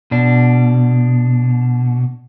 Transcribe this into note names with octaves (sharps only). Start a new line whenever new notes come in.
B2 D4